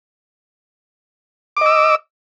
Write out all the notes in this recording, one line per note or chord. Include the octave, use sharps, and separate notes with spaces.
D#5 D6 E6